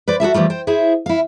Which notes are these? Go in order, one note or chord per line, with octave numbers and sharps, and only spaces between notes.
B4 C5 D5
F#4 G#4 A4 E5
E3 F3 G3 A3
C5 G5
E4 G#4 C5
E4 F5